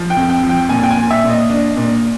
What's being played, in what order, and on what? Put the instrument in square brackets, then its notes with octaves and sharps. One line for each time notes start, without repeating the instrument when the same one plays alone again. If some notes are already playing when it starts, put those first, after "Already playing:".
Already playing: [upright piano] F3
G5
F2
G5
F3
G5
A#2 G#5
G5
G#5
A#2
E5
A#2
D#5
D4
A#2